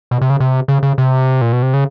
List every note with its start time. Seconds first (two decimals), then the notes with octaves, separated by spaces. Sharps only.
0.11 B2
0.21 C3
0.30 C#3
0.40 C3
0.68 C#3
0.83 C#3
0.98 C3
1.41 A#2
1.53 B2
1.63 C3
1.74 C#3